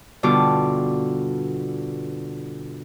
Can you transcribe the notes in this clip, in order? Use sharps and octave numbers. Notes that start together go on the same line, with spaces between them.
G2 B2 D3 F4 D6